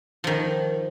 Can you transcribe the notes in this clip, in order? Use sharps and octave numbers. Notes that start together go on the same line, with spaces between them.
D#3 F3